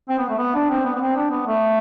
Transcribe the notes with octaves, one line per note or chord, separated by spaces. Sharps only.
C4
B3
A3
B3
D4
C4
B3
B3
C4
D4
B3
A3